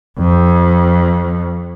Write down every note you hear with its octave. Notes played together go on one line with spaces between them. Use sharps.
F2